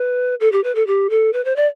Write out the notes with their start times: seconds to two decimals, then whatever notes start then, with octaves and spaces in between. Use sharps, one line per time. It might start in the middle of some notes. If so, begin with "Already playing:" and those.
Already playing: B4
0.40 A4
0.52 G4
0.64 B4
0.75 A4
0.87 G4
1.10 A4
1.33 B4
1.45 C5
1.56 D5